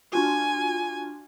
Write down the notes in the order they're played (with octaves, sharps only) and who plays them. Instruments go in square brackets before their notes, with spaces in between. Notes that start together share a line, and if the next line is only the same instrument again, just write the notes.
[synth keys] D4 F4 F#4 [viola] G#5